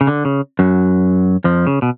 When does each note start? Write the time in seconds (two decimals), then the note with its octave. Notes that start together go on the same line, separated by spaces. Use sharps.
0.01 C#3
0.07 D3
0.25 C#3
0.59 F#2 F#3
1.44 F2 F3
1.67 C#3
1.82 B2